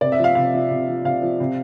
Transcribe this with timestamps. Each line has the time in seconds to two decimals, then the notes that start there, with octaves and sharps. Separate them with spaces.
0.01 C3 D5
0.12 E5
0.18 F3
0.24 F5
0.35 C3 F5
0.54 F3
0.70 C3
0.88 F3
1.05 C3 F5
1.22 F3
1.40 C3